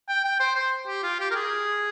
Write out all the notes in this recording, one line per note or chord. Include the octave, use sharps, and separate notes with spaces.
G5
G5
C5
C5
G4
F4
G4
A#4
G#4